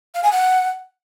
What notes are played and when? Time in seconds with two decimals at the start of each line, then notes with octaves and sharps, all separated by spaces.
0.14 F5
0.23 G#5
0.32 F#5